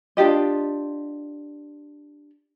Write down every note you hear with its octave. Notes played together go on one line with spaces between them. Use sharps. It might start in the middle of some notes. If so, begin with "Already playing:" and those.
D4 F4 G4 D#5